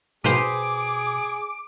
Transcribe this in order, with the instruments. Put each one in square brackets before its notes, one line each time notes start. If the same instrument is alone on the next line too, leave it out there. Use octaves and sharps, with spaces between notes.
[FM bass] B2 [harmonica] G#4 [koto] B4 C5 G5 [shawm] D6